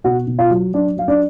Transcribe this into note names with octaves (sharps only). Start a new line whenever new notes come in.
B2 F#4 F#5
B2
F4 F5
F#3
F#3 D4 D5
F#3 F5
D4 D5